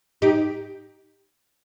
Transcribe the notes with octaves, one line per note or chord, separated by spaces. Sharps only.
D#4 G4